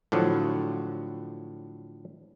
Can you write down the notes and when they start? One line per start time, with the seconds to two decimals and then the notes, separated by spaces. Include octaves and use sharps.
0.12 A2 D3 F3 F#3